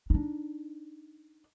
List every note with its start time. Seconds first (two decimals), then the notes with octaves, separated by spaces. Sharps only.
0.10 D4 D#4